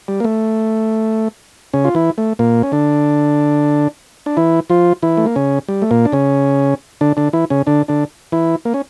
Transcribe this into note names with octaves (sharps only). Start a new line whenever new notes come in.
G3
A#3
A3
C#3 C#4
F4
E3 E4
A3
A#2 A#3
C#4
D3 D4
D4
E3 E4
F3 F4
E3 E4
A3
A#3
C#3 C#4
G3
A3
A#2 A#3
D4
C#3 C#4
D3 D4
D3 D4
E3 E4
C#3 C#4
D3 D4
D3 D4
E3 E4
A#3
C#4